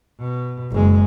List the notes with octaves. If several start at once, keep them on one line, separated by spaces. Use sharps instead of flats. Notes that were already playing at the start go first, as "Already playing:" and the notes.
B2
F#1 G#3